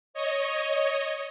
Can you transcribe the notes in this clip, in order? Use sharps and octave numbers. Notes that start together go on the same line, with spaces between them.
C#5 D#5